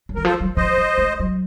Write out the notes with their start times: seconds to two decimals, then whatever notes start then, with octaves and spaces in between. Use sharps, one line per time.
0.09 F#3
0.15 D#3 A#4
0.25 F3 A4 C5
0.41 F#3
0.57 F3 C5 D#5
0.77 F3
0.98 A3
1.20 F#3